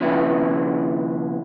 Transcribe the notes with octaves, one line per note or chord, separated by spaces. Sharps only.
D#2 C#3 F3 D4 E4 B4